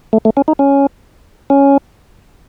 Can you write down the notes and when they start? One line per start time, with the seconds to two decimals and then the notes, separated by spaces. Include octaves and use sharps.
0.13 A3
0.25 A3
0.37 C#4
0.48 D#4
0.59 C#4
1.50 C#4